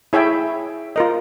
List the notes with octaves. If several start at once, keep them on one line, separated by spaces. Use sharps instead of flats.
E4 G#4 C#5 E5 G5
F4 A#4 D#5